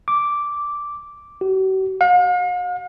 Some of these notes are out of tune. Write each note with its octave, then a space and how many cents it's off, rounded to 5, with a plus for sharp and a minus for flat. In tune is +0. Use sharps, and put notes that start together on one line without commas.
D6 -5
F#4 +45
F5 +45